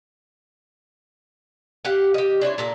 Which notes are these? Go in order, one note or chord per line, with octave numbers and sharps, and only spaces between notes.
G4 F5 F#5
G4 D#5
D4 E4 C5 C#5
A#2 A#3 A4